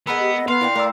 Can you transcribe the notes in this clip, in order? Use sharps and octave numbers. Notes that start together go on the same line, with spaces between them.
G#3 B3 A#4 F#5 B5 E6
G4
D#5
B3 A4 F5 C6
A#3 D4 E4 F4 G5
A3 A#4 D5 E6